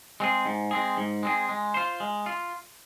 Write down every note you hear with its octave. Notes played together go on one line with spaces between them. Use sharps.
G#3 C4 G#4
G#2
G#3 C4 G#4
G#2
G#3 C4 G#4
G#3
F4 C5
G#3
F4